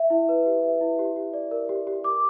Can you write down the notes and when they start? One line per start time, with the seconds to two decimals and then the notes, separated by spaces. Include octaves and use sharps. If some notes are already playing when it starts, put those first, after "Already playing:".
Already playing: E5
0.10 E4
0.29 B4
0.46 G4
0.63 E5
0.81 E4
0.99 G4
1.16 G4
1.33 D5
1.51 A#4
1.69 G4
1.87 G4
2.04 D6